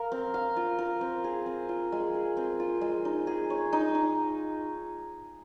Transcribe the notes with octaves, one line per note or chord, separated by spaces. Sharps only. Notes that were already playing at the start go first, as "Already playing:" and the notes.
Already playing: A#4 F5
C4
F5
F4
A#4
C4
G#4
C4
F4
G#3
G#4
C4
F4
G#3
D#4
G#4
C#5
D#4
D#4